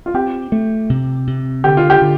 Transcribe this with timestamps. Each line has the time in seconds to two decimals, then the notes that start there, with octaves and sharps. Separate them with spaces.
0.06 F4
0.14 C4 G4
0.52 A3
0.90 C3
1.27 C3
1.64 D3 G4
1.77 F4
1.90 G4
2.02 D3